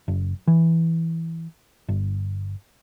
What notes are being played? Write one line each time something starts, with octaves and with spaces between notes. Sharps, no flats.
F#1
E3
G1